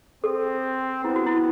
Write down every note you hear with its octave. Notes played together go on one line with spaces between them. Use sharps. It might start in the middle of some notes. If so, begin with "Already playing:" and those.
C4 A4
B3 E4
F#4
E4